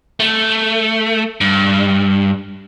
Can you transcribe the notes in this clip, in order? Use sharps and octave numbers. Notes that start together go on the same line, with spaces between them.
A3
G2